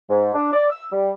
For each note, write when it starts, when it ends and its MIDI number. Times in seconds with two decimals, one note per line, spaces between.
0.10 0.32 44
0.34 0.53 62
0.53 0.67 74
0.70 0.87 88
0.92 1.12 55